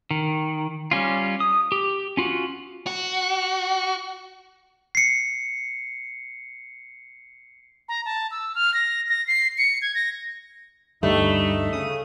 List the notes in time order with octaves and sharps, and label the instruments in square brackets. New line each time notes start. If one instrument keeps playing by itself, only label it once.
[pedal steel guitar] D#3
G3 C#4 F4
D#6
G4
C#4 F4 F#4
[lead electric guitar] F#4
[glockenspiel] C7 C#7
[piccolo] A#5
A5
E6
F6
A#6
A#6
C7
C#7
G#6
A#6
[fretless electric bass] D2 G2 [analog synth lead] G3 [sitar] A3 [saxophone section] D#4
[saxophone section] C#3 [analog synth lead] D#6